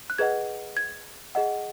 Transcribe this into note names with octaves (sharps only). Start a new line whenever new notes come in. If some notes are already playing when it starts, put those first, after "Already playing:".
F#6
G#4 B4 D#5 F#5 G#6
G#6
G#4 D#5 F#5